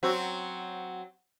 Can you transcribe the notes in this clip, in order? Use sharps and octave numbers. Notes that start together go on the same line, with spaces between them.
F#3 C4 F#4